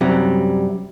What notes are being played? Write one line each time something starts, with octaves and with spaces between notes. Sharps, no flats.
F#2 C3 F#3 G3